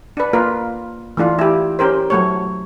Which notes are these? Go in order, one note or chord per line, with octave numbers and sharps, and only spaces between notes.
D4 B4
A#3 F4 A#4 B4
E3 A3 D4 F4
E4 G4
C#4 G4 A#4 C5
F#3 A3 C#5